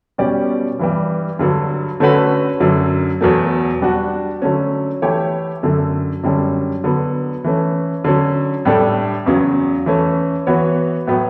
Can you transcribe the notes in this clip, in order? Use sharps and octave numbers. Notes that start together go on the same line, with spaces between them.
B2 G3 C#4 G4 D5
G2 E3 G3
G2 D3 F#3
D3 A3 C#4 F#4 B4
F#2 D3 F#3
E2 B2 F#3 A3
G3 D4 F#4
D3 F#3 A3 C#4
E3 A3 E4 G4 C#5
F#2 D3 A3
F#2 D3 G3 C#4
D3 F#3 B3
E3 A3 C#4
D3 F#3 C#4
A2 G3 D4 A4
E2 C#3 F#3
E3 A3 C#4
E3 B3 F#4 C#5
A2 F#3 B3